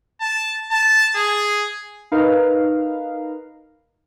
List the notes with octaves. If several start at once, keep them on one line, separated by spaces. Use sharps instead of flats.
A5
A5
G#4
D#4 A#4 B4 F5